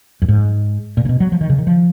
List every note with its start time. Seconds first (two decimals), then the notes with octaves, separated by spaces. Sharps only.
0.22 F#2
0.28 G#2
0.97 A#2
1.05 C#3
1.09 B2
1.20 F#3
1.32 F3
1.41 D#3
1.49 C#3
1.58 D#3
1.67 F3